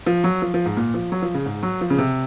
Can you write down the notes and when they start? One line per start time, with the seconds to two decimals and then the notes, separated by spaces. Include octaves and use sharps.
0.06 F3
0.24 F#3
0.42 F3
0.54 F3
0.65 G#2
0.77 A#2
0.94 F3
1.12 F#3
1.22 F3
1.34 C#3
1.45 G#2
1.63 F#3
1.81 F3
1.90 C#3
1.98 C3